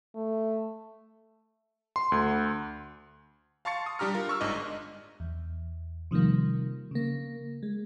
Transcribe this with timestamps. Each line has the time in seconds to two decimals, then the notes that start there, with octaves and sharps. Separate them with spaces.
0.15 A3
1.96 C6
2.12 D2
3.65 F5 A5 C6 C#6 A6 C#7
3.86 D#6
3.99 G3 D4 G4 A#5 F6
4.14 F4 A#4
4.29 C#6 E6 F6
4.41 G1 G#2 D4 D#5
5.20 E2
6.11 C3 D#3 F3 G3 A#3
6.91 C#3 A#3
7.63 G#3